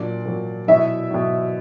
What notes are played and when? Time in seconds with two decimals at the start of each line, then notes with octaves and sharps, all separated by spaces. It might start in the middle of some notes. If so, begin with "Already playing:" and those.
Already playing: A#2 F#3 D4 D5
0.26 A#2 F#3
0.68 B2 F#3 E4 E5
1.11 B2 F#3